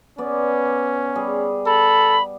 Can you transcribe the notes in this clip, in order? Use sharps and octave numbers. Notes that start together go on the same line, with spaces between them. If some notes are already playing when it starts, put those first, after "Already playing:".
B3 C#4 D5
G3 G#4
A4 B5